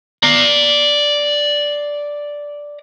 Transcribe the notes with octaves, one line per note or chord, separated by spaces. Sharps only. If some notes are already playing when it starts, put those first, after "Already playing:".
D5 A#5